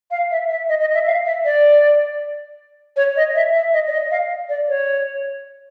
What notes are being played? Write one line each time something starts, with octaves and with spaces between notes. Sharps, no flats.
F5
E5
E5
D#5
D#5
E5
F5
E5
D5
C#5
D#5
E5
E5
D#5
D5
D#5
F5
D5
C#5